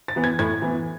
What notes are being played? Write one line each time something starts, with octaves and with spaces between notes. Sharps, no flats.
A6
E3 B3
G#6
A2 G#6
E3 B3